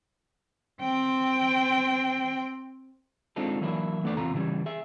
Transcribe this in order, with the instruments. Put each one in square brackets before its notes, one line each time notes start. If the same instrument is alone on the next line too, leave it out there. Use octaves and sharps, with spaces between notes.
[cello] C4 G5
[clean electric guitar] G#3 C4 D4 D#4 F4 A4
E3 F#3 A#3 D4 E4
E2 A3 B3 D4 A4 D5
E2 C3 F4 A#5
C#3 E3 G3 C#4
G#4 E5